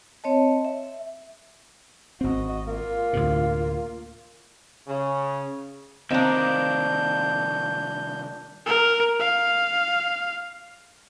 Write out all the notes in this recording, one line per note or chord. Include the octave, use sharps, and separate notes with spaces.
C4 C#5 D#5 A5
E5
G#1 C4 F#4 D#5
A#3 F4
D2 A2 C3
C#3
C2 D#3 A#3 C4 D4 D#5 G6 E7
A#4
F5